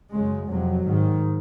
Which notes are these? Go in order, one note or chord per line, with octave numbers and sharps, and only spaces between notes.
F#2 C#3 G#3
F2 C3 F#3
G#2 D#3